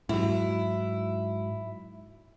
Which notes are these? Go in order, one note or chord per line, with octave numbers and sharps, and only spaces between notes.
G#2 F#3 E4